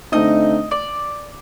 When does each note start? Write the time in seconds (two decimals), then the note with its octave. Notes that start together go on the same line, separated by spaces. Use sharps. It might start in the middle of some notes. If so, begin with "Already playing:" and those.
0.12 D3 A3 C4 D#4 D#5
0.71 D5